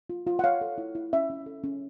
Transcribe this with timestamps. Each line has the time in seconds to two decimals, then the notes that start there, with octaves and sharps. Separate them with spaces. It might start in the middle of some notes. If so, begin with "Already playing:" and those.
0.10 F4
0.27 F4
0.39 F#5
0.44 C#5 F5
0.61 A4
0.78 E4
0.95 E4
1.13 C#4 E5
1.30 C#4
1.46 A4
1.64 C#4